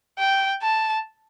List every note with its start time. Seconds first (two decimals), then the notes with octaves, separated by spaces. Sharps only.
0.19 G5
0.62 A5